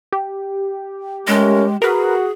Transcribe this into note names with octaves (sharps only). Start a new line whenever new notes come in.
G4
G#3 A3 C#4 A#4
F#4 G#4 A#4 B4